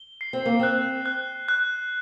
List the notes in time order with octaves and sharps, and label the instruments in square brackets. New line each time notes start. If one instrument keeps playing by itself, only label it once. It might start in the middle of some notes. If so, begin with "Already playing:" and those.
Already playing: [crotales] G7
C7
[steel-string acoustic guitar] C4
A#3
[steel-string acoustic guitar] C4 [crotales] F#6
[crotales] F#6
F#6